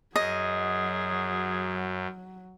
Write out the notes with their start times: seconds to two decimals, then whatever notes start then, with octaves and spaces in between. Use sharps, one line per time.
0.16 F#2 F#3 G#4 D#5